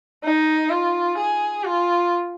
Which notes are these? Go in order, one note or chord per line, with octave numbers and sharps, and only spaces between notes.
D#4
F4
G#4
F4